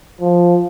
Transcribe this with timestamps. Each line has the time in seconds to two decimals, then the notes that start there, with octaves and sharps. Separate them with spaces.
0.21 F3